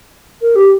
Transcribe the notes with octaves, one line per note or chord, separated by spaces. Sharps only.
A#4
G4